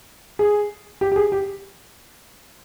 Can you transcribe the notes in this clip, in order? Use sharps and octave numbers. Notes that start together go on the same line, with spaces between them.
G#4
G4
G4
G#4
G4